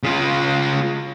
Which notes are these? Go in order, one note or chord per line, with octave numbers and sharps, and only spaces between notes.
C#3 F4